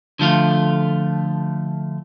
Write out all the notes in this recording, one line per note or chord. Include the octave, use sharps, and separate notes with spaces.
D3 F3 A3 F4